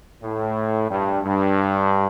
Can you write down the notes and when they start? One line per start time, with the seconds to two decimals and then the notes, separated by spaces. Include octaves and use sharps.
0.23 A2
0.90 G2
1.23 G2